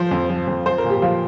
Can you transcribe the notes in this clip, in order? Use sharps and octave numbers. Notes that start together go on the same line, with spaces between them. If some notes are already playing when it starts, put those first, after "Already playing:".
Already playing: F3 C5
F2
F3
F2
F3 C5
A#4
A#2
G4
F3 F4